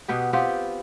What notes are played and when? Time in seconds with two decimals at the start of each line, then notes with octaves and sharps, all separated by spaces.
0.08 B2 B3 G4
0.33 B3 C4 F4 G4